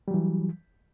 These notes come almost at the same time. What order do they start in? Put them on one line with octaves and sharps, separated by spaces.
G3 F#3 E3